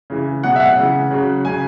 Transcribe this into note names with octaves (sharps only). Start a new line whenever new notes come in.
C#3 E3
B2 F#3 F#5
E5
F#5
C#3 E3
C#3 F#3
C#3 F#3 G#5